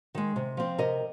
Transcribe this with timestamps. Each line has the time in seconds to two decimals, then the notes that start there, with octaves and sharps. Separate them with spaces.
0.15 D#3 G#3
0.36 C3
0.57 F3 C4
0.78 C3 A#4 D#5